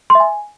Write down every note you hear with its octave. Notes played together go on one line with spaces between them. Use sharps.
C6
E5
G#5